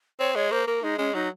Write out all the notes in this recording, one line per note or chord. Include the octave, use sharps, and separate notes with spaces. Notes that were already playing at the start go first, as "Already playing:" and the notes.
C4 C#5
G#3 C#5
A#3 C5
A#3 A#4
G#3 D#4
G#3 C#4
F#3 D#4